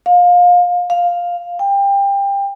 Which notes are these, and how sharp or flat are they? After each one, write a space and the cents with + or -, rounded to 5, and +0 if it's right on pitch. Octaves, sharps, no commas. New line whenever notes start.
F5 +25
F5 +5
G5 +25